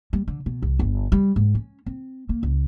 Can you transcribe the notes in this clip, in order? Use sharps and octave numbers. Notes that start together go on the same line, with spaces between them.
G3
D3
B2
C2
G1
G3
G#2
C#4
C4
A#3
C#2